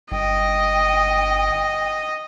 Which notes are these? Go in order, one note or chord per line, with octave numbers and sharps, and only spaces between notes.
G1 D#5 G5